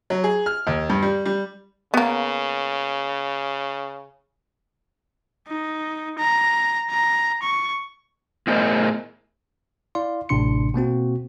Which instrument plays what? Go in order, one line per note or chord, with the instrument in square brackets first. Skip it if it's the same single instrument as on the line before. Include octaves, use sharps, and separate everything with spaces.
[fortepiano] F#3
G#4
F6
D#2
G2
G3
G3
[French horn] C#3 [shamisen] A#3 B3
[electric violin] D#4
A#5
A#5
C#6
[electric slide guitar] A2 B3 G#4 A#4 C5 D#5
[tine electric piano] E4 D5 F5 C6
A1 A2 C3 D4 C6 C#7
B2 A#3 C4 F#4